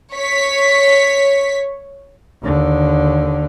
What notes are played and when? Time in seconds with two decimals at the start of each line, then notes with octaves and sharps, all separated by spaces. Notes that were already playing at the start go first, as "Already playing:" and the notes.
0.13 C#5 B6
2.43 D#2 D3